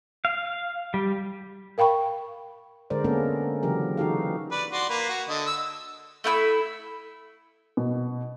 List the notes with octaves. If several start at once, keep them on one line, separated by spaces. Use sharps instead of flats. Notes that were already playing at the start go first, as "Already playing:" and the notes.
F5
G3
A#4 F5 G5 B5 C#6
D3 G#3 A#4 C5 D5
G#3 A#3 B3 C#4 A4 A#4
C#3 E3 F#3 G4 A#4
E3 D#4 F#4 G4 A4 F5
B4 D5
F#4 D5 C6
A#3 B4
F#4
D3 D#5
E6
A3 E4 G5 E6
B2